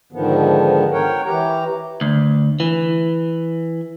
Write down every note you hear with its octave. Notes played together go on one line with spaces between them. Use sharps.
G#2 D3 D#3 F3 B3
A#4 C#5 F#5 G5
E3 G4 A#5
D2
E3